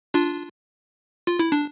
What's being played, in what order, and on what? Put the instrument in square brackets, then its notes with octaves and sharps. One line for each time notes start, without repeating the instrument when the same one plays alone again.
[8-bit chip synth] D4 F4
F4
E4
D4